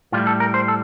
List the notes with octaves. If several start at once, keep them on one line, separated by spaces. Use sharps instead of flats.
A2 G3 F4
A4
A#4
C5
A4